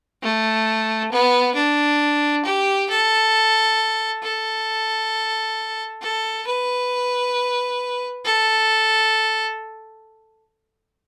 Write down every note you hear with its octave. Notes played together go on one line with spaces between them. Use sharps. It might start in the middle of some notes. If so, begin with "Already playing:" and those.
A3
B3
D4
G4
A4
A4
A4
B4
A4